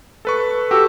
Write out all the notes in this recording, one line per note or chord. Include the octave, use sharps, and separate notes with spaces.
A4 B4 C#6
F#4 G4 A4